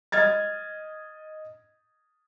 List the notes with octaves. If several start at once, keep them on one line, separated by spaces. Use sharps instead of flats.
D#5 F6 G#6 A6